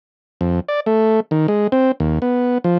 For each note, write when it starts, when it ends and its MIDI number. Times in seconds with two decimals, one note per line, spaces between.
0.41 0.60 41
0.69 0.80 74
0.86 1.20 57
1.31 1.47 51
1.48 1.67 56
1.72 1.92 60
2.00 2.19 39
2.22 2.58 59
2.64 2.78 53